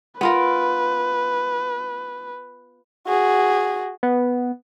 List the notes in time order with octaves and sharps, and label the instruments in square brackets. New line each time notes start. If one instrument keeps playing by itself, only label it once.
[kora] B3 F4 A#4 [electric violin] B4
[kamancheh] F#4 G#4
[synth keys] B3